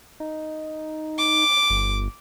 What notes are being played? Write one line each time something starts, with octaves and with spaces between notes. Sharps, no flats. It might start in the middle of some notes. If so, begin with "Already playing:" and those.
D#4
D6
G1